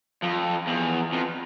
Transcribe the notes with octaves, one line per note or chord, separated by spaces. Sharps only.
F2
E2
F2